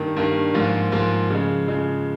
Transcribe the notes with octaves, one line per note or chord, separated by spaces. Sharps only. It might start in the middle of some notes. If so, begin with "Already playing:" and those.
Already playing: G2 D#3 A#3
G2 D#3 A#3
G#2 F3 A#3 F4
G#2 F3 A#3 F4
C#3 F3 G#3
C#3 F3 G#3